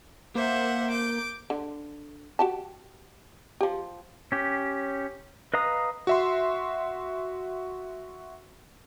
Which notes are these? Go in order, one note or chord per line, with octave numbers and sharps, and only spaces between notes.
A#3 C5 E5 F#5
D6 G6
D3
F#4 G4 A5
F3 G4
C#4 G4
B4 D#5 F5 A#5 D#6
F#4 E5 C6